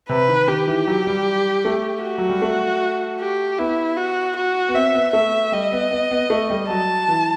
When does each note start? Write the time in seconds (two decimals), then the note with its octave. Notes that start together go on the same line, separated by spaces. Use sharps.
0.09 C3 B4
0.28 D#3
0.48 D#3 G4
0.67 E3
0.87 F#3
1.07 G3
1.65 A3
2.03 F#4
2.18 F#3
2.29 G3
2.42 A3
3.20 G4
3.59 B3 E4
3.97 F#4
4.36 F#4
4.68 B3
4.74 C4 E5
4.95 B3
5.13 A3 E5
5.52 G3 D#5
5.72 B3
5.91 B3
6.11 B3
6.30 A3
6.50 G3
6.69 F#3 A5
7.08 E3